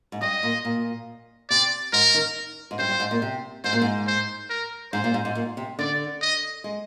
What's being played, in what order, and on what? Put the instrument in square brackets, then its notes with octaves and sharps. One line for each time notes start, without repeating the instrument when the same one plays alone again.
[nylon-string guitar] G#2
[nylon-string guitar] G2 [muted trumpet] D#5
[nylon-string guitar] A#2
A#2
[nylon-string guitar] C3 [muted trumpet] D5
[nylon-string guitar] G#2 [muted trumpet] A#4
[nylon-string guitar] D#3
G#2
[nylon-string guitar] G2 [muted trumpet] C5
[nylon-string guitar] G2
G#2
A#2
C3
[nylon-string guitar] G#2 [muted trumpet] C5
[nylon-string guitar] A#2
G#2
[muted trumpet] C5
A#4
[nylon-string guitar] G#2 [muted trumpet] C5
[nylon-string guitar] A#2
G#2
G#2
A#2
C3
[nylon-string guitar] D3 [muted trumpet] D5
[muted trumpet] D#5
[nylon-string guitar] G#3